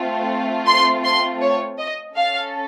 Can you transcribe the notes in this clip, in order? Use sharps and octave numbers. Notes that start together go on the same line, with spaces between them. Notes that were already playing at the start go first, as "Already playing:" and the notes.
Already playing: A3 C4 F4
C6
C6
C#5
D#5
C#4 A4 F5